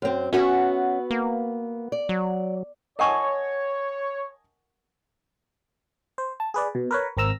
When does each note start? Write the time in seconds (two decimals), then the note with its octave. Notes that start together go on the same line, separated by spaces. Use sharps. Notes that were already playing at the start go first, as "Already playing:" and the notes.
0.02 F#2 C4
0.33 B3 C#4 F#4 E5
1.11 A#3
1.92 D5
2.09 F#3
2.99 A#4 C#5 D#5 F#5 G#5 A5 C#6
6.18 C5
6.40 A5
6.54 G#4 B4 D5
6.75 B2
6.91 A#4 B4 C#5
7.17 G#1 C4 A#4 A#5 E6